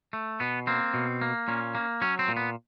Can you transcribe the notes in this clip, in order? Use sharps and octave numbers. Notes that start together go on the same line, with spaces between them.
A3
B2 B3
A#3 C4
B2
A#3
A#2 C#4
A#3
F#3 C#4
C4
A#2
B3